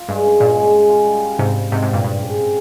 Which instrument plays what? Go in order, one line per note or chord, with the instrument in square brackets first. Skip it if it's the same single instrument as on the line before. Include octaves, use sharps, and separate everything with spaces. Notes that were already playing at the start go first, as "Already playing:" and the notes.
Already playing: [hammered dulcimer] F4
[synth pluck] G2 [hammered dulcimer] G#3
[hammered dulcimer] C#4
[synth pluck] G2 A#2 [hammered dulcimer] G#3
[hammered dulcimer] G#3
G#3
F4
G3
G3
[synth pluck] G#2 C3 [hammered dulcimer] G3
[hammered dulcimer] G3
[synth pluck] G#2 C3 [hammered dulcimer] C4
[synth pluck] G#2 C3
[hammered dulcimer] G4
[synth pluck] G2 A#2
[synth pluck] G2 [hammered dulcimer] G4
[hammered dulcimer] C#3
C4